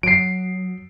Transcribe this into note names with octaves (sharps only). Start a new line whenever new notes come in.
F#3 C7 D7